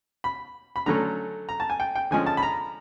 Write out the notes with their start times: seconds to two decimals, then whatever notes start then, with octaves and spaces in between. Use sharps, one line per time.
0.24 B5
0.76 B5
0.86 D3 F#3 A3 C#4 A#5
1.49 A#5
1.60 A5
1.70 G#5
1.80 G5
1.95 G5
2.11 D3 F3 G#3 C#4 G#5
2.26 A5
2.37 B5
2.43 A#5